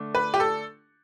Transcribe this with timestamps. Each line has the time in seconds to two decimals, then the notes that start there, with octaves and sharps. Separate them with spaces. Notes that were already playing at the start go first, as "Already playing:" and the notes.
Already playing: D3 A3 D4
0.15 B4
0.34 G4
0.40 A4